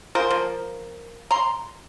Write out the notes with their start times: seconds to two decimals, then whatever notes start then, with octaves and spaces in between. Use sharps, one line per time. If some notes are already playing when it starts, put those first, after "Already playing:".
0.15 F4 G#4 A#4 C5
0.30 F3 A#3
1.31 A#5 C6